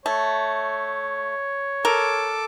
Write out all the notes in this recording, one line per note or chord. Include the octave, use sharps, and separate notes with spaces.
A3 C#5
A4 A#4 D6